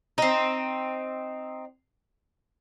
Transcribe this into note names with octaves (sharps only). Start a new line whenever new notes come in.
C4 D#4